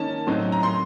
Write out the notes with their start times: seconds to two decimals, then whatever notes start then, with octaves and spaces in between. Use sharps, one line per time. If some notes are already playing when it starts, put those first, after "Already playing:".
Already playing: D#3 A#3 C#4 A5
0.27 A2 F#3 C4 D#4
0.52 A#5
0.63 C6